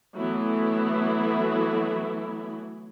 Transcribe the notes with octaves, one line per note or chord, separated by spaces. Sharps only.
E3 F#3 A3 B3 E4